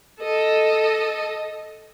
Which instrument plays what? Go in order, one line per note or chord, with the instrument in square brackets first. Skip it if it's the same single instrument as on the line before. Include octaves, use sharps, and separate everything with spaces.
[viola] A4 D#5